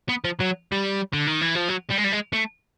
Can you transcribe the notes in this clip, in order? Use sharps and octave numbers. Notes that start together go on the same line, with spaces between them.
B3
F3
F#3
G3
D3
D#3
E3
F3
F#3
G3
G#3
G3
G#3
A3